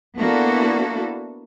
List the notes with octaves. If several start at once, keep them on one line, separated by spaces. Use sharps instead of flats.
A#3 B3 D4 E4 F#4 A4